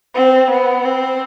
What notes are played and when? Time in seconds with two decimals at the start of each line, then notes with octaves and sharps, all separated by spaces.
0.14 C4
0.50 B3
0.85 C4